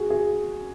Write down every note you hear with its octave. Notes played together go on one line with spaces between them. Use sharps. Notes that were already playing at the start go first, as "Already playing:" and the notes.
Already playing: F#4 G#4
G#4